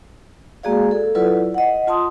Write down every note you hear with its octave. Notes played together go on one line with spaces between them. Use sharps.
G#3 A#3 F#4 G#4 D5 F5
A4
F#3 E4 F4 A4 B4 D5
D#5 F#5
F4 A5 C6 D#6